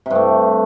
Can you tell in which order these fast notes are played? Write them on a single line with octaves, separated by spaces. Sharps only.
C3 G2 A3